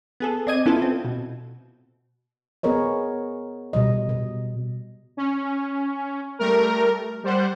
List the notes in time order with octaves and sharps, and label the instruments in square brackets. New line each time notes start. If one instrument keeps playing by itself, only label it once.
[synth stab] B3 G#4 A4
C4 D5 D#5 G#6 D#7
B3 C#4 E4 F4 A4
C4
B2
[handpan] B3 G#4 A#4 C#5 D#5
B2 G3 D#5
B2
[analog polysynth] C#4
G3 A3 A#4
G3 C5 F#5